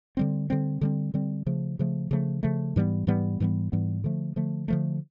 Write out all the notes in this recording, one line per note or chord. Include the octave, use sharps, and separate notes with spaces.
D3 G3 C4
D3 G3 C4
D3 G3 C4
D3 G3 C4
C#3 F3 A3
C#3 F3 A3
C#3 F3 A3
C#3 F3 A3
G#2 E3 G3 B3
G#2 E3 G3 B3
G#2 E3 G3 B3
G#2 E3 G3 B3
D3 F3 A3
D3 F3 A3
D3 F3 A3